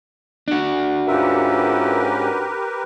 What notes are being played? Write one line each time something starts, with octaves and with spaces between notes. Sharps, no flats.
D4 F#4
G#2 C#4 F4 G4 A#4 B4 E5